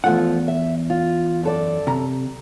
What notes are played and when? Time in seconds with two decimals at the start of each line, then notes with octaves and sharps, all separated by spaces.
0.04 E2 F3 A3 F4 F#5
0.48 E5
0.90 F4
1.43 F#2 A4 D5
1.87 C3 A#5